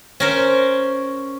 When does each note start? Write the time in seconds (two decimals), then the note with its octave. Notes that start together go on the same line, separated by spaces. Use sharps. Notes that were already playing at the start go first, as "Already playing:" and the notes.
0.20 C#4 A#4 C5